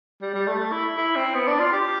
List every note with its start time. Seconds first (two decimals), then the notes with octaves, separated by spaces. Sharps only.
0.22 G3
0.34 G3
0.47 A3
0.59 A3
0.72 E4
0.97 E4
1.16 C4
1.34 B3
1.47 D4
1.60 F4
1.72 G4